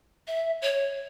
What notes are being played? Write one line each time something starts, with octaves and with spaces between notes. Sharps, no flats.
E5
C#5